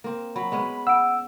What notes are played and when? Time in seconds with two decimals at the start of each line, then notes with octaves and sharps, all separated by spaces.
0.04 A#3 C4
0.36 F#3 B5
0.52 G#3 B3 C#4
0.87 F#5 E6 D7